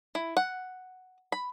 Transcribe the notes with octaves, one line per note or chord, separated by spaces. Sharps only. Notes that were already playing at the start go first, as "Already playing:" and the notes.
E4
F#5
B5